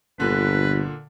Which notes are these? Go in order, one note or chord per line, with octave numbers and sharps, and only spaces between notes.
G1 A#2 D3 B4